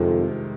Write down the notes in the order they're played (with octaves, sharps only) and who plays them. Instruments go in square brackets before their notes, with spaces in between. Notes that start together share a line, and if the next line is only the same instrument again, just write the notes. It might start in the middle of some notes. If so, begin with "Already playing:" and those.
Already playing: [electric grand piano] C2 C3 D#3 G#3 [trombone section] F2